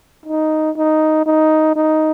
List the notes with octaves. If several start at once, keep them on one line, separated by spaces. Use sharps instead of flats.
D#4
D#4
D#4
D#4